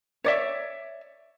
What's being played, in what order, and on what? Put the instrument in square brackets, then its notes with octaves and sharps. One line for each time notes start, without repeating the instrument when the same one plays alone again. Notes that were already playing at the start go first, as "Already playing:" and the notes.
[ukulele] C#5 D5 E5